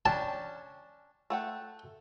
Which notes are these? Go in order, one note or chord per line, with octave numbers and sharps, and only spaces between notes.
C#4 D4 G5 A5
A3 F#5 G5